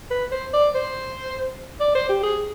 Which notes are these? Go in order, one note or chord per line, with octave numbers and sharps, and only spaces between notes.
B4
C5
D5
C5
D5
C5
G4
G#4